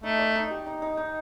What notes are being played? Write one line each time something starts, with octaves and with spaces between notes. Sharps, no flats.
A3 D#4
D5
D#4
G4
D#4
D#4
D#4